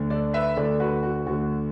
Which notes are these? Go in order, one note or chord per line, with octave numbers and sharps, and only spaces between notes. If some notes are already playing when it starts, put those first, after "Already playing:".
Already playing: D2 D3
A4 D5
B4 E5
D2 D3 A4 D5
F#4 B4
F#4
D2 D3 F#4